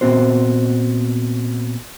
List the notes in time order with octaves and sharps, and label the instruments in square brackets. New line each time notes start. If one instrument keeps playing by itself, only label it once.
[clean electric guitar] A#2 B3 C4 F#4 C5